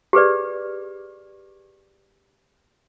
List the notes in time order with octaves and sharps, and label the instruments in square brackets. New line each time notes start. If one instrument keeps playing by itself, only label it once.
[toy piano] G4 G#4 B4 D5